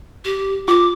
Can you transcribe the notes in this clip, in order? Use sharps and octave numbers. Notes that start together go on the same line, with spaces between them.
G4
F4 D6